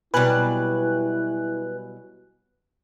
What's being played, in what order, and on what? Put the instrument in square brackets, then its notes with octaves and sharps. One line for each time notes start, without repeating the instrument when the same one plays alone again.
[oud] B2 F#3 G3 [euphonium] E4 [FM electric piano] B4 G#5 F#6